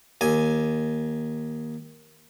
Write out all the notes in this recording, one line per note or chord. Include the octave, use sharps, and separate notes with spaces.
D#2 G#5